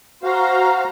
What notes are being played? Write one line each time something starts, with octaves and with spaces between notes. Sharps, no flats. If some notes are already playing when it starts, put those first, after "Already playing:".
F#4 C5 F5 A#5